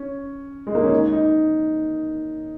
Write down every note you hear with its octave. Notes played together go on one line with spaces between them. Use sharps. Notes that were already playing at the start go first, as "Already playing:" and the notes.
Already playing: C#4
G#3
A#3
C#4
D#4
D#4